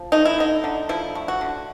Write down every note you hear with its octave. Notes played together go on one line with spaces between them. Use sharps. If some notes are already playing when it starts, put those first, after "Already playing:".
Already playing: F3
A3 D#4
E4
D3 D#4
D3
F3 E4
A3
F#4
D3